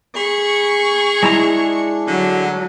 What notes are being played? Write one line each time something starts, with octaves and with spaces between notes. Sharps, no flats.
G#4 B5 C#6
G#3 D4 E4 A#5
D3 F#3